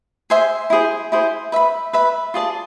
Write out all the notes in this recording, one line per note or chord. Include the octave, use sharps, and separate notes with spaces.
G#4 C5 E5 G#5
E4 G#4 C5
E4 G#4 C5
B4 E5 B5
B4 E5 B5
F4 G#4 D5 A5